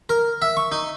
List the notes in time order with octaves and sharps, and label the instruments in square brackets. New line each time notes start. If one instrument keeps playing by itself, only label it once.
[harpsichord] A#4
E5
C#6
D#4